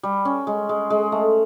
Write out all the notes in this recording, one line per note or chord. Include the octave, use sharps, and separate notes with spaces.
G3
C#4
G#3
G#3
G#3
A3